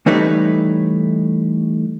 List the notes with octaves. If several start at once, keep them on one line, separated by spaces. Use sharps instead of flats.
E3 G3 A3 D#4 B4 C#5